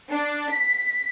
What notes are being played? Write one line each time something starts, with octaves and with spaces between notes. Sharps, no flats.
D4
B6